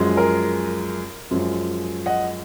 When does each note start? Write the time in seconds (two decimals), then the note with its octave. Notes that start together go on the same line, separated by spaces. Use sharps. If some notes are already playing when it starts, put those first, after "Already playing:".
Already playing: F#2 F3 G#3
0.17 A#4
1.31 F#2 F3 G#3
2.06 D#5 F#5